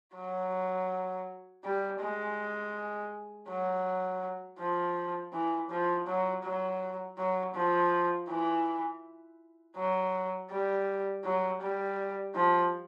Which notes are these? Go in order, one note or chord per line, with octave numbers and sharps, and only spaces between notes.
F#3
G3
G#3
F#3
F3
E3
F3
F#3
F#3
F#3
F3
E3
F#3
G3
F#3
G3
F3